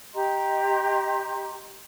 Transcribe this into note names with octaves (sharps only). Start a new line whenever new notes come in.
G4 D#5 A#5 C6